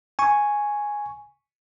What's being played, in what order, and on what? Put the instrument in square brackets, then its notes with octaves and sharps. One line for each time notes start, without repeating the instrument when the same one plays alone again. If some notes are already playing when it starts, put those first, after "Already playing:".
[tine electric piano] G#5 C#6